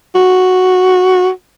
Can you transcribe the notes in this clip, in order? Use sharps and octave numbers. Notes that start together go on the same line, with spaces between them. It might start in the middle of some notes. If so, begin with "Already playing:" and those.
F#4